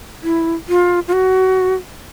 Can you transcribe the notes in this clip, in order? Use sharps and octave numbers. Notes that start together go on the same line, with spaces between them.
E4
F4
F4
F#4